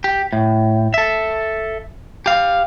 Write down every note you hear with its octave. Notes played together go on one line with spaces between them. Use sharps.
G4
A2
A4 E5
G4 F5